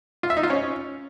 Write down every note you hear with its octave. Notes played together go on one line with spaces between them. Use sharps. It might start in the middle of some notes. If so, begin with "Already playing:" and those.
F4
E5
D#4
F4
C#4